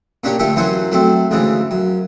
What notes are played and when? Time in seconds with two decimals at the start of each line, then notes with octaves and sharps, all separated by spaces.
0.24 A#2 C#4 D4 G4 C#5
0.39 D3 A3 F4 G4 A4
0.56 F#2 E3 F#3 C5 G#5 C#6
0.91 F#3 A3 C4
1.31 D2 G#2 C#3 E3
1.71 F#2